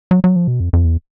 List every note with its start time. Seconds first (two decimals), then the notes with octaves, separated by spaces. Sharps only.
0.11 F#3
0.24 F#3
0.36 F3
0.48 B2
0.60 F2
0.73 F2
0.84 E2